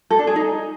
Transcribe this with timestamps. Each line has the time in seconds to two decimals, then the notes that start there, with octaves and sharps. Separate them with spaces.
0.11 A4
0.19 D4
0.27 G#4
0.36 D#4